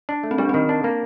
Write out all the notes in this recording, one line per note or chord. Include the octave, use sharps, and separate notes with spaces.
D4
A3
C4
G3 D4
C4
D#3
D4
A#3